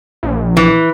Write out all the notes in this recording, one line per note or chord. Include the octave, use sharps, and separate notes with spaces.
A#1
E3